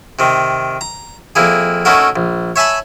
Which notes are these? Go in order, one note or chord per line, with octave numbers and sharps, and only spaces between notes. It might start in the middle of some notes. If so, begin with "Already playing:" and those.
C3 D#3
A#5
F2 A#3 E4 G#4
A3 C#4 D#4 E4 F#4 A#4
A#1
C#5 E5 G#5 A5 B5